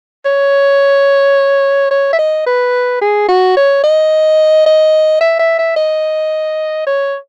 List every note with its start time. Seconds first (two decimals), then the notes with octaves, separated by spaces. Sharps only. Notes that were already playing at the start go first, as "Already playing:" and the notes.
0.25 C#5
1.91 C#5
2.13 E5
2.19 D#5
2.46 B4
3.01 G#4
3.29 F#4
3.57 C#5
3.84 D#5
4.66 D#5
5.21 E5
5.39 E5
5.59 E5
5.76 D#5
6.87 C#5